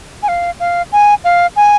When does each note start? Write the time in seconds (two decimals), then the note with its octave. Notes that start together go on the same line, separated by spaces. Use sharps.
0.23 G#5
0.28 F5
0.60 F5
0.92 G#5
1.24 F5
1.56 G#5